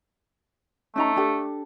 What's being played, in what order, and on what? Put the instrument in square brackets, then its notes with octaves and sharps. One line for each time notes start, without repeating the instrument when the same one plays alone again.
[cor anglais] A3 [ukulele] C#4 D#4 A#5
[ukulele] D4 G4 A4